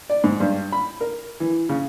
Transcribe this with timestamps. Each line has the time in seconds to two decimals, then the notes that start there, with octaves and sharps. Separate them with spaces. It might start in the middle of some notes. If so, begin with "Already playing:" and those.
0.10 D5
0.24 G#2
0.40 G2
0.72 B5
1.01 A#4
1.40 E3
1.69 C#3